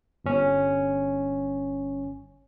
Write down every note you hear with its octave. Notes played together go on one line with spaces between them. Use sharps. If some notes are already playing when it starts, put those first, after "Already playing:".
G1 C#4